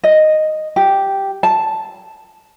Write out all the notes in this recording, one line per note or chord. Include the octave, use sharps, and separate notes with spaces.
D#5
G4
A5